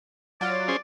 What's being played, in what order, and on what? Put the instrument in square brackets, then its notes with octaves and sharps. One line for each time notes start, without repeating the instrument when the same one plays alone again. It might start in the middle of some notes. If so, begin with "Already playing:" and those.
[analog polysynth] F#3 F4 [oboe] D5
[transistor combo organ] C#4 G#4 C5